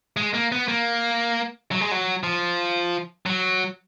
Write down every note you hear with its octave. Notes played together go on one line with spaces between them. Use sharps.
G#3
A#3
B3
A#3
F#3
G#3
F#3
F3
F#3